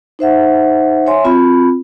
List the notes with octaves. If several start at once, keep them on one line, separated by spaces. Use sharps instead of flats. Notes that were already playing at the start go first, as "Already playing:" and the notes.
D#4 C5 E5 F#5
C#5 E5 G#5 C6
C4 F4 B5